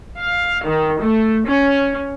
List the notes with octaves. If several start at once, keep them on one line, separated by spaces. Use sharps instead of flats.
F5
D#3
A3
C#4